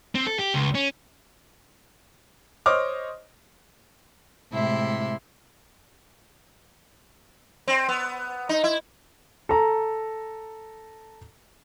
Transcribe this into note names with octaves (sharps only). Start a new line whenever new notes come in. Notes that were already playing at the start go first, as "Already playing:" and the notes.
C4
A4
G4
C#2
C#4
C5 C#5 D#5 D6 F6
A2 C3 G#3 E4 E5 C6
C4
B3
D#4
E4
A4 A#5